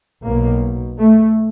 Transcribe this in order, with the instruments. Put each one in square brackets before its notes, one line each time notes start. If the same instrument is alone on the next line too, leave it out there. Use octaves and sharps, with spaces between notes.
[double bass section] B1 B2 A#3
A3